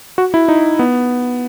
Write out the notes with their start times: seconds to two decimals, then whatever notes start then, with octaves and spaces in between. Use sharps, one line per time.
0.18 F#4
0.34 E4
0.48 D#4
0.79 B3